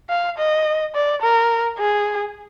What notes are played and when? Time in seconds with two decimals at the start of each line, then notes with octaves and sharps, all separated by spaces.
0.10 F5
0.38 D#5
0.95 D5
1.22 A#4
1.78 G#4